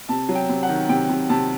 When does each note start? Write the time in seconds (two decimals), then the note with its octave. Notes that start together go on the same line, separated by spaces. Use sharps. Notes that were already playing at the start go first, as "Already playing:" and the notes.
0.09 C3 A5
0.29 F#3
0.35 G5
0.49 C3
0.63 F#5
0.69 D#3
0.89 C3 G5
1.09 C3
1.29 C3 A5